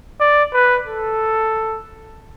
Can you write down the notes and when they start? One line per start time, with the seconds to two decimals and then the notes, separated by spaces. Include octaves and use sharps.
0.20 D5
0.54 B4
0.87 A4